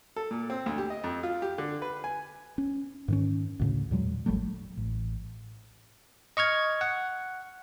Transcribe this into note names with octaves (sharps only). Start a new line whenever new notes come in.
A4
A#2
C4
D2
G4
D#5
F2
F4
G4
D3
B4
G#5
C#4
G#2 D#3 C#4
D2 A2 C#3
E2 A#2 F#3 G#3
G#1 F#3 G3 A3
A1
D#5 C#6 F6 G#6
F#5